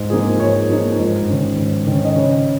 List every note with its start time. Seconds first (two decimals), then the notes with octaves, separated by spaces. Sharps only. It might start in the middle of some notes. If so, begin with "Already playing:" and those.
Already playing: G#2
0.10 F3 A#3 D#4 G#4
0.40 G#2 C#5
0.69 F3 A#3 D#4
0.99 G#2
1.29 D#3 C#4
1.58 G#2
1.87 D#3 C#4
2.05 D#5
2.16 C#3 C#5